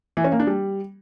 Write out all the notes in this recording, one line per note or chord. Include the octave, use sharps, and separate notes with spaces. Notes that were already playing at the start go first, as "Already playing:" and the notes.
E3
C#4
A#3
D4
G3